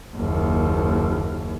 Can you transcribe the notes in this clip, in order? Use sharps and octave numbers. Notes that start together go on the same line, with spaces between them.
F#1 D#2